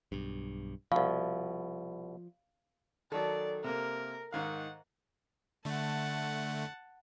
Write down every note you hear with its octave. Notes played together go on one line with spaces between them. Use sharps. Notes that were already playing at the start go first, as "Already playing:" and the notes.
B1 G2
C2 B2 F3 F5
D#3 F#3 A4 D5
C3 A#3 A#4
G#2 D#3 F5 F#5
D3 A3 F#5 A5